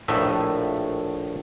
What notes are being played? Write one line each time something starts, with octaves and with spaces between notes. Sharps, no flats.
A#1 A2 A3 D#5 E5